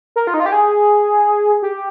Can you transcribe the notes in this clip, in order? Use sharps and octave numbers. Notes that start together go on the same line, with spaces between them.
A#4
F4
D#4
F4
G4
G#4
G4